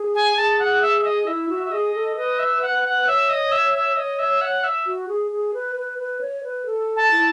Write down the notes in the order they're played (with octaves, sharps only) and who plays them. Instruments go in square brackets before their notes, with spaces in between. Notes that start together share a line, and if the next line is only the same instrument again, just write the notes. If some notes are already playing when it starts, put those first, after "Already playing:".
Already playing: [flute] G#4
[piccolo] G#5
[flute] G#4 [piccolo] A5
[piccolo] F#5
E5
E5
D#5
[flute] E4 [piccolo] E5
[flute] F#4
[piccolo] E5
[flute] G#4 [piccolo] D#5
[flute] A4
[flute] B4 [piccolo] D#5
[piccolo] E5
F#5
F#5
[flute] C#5 [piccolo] E5
[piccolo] D#5
E5
E5
[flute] C#5 [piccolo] D#5
[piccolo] E5
F#5
E5
[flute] F#4
G#4
G#4
B4
B4
B4
C#5
B4
A4
[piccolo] A5
[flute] E4